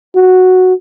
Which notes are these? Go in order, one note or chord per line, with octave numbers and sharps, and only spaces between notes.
F#4